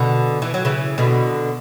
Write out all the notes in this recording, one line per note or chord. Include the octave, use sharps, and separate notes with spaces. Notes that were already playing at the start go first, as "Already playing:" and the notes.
Already playing: B2 D3
E3
F#3
C#3 E3
B2 D3